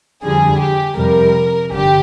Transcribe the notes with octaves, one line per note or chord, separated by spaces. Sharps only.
F2 D3 G3 G#4
G4
F2 C3 G3 A#4
G1 D3 G4